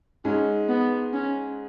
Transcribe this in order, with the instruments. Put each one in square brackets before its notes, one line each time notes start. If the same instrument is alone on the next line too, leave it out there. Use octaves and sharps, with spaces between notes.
[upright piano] G#2 G#3 [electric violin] C#4
[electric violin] B3
C#4